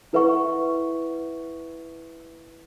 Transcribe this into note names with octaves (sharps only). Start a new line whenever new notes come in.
E4 A4 B4 E5 F#5 C#6